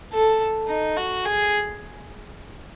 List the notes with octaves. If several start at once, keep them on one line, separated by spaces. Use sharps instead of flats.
A4
D#4
F#4
G#4